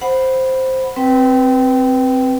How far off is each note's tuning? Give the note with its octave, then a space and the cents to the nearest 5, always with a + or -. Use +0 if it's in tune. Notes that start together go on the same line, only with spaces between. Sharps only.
C5 +0 F#5 +0 B5 +0
C4 +0 B4 +0 G5 -15